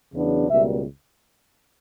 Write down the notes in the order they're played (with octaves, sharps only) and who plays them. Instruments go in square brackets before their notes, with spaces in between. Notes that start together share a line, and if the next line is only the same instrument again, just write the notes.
[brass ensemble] E2 C#3 F#3 B3 D4
C#2 B2 G3 A#3 E5